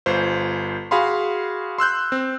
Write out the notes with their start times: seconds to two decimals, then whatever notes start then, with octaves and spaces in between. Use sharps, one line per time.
0.06 G1 F4 C5
0.91 F#4 G#4 F5 B5 C6
1.78 C6 E6 F#6 G6
2.12 C4